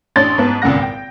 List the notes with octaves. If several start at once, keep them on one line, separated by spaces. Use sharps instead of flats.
A1 D4 C#5 C6 A6
G#2 B3 A5
G#1 C#2 A#2 C#3 F#5 A#6
G5